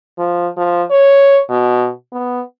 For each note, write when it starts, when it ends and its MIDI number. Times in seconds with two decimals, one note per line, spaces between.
0.19 0.48 53
0.57 0.83 53
0.91 1.40 73
1.50 1.89 47
2.13 2.41 59